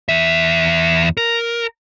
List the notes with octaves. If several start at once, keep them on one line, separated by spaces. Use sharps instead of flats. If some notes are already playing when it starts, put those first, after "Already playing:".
E2 E5
A#4